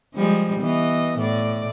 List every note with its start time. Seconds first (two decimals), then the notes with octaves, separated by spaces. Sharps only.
0.14 F3 G3 G#3
0.60 E3 B3 D#5
1.19 A2 D5